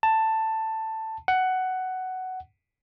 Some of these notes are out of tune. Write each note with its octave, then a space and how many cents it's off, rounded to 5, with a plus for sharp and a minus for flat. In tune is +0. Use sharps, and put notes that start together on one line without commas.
A5 +10
F#5 +10